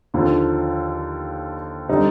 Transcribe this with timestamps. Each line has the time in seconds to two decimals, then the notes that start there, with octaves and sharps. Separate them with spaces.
0.14 D#2 D3 F3
1.89 D3 G3 C4 D#4